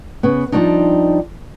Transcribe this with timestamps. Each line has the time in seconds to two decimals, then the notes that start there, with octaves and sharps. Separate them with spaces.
0.23 C#3 B3
0.52 F3 G3 A#3 C4 D4 D#4